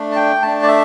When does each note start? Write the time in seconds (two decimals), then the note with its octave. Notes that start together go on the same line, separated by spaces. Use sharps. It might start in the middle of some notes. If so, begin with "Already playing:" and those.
Already playing: A3 D4
0.11 A5
0.16 G5
0.42 A3 D4 A5
0.63 D5
0.68 E5